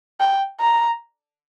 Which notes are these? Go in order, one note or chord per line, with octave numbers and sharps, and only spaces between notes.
G5
A#5